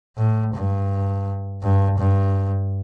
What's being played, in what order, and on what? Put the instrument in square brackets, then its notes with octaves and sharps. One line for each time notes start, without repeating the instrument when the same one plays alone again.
[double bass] A2
G2
G2
G2